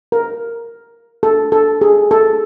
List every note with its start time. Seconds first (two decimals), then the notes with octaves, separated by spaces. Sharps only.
0.12 A#4
1.23 A4
1.52 A4
1.81 G#4
2.11 A4